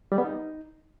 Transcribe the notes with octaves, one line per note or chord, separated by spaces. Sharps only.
G3
B3
D#4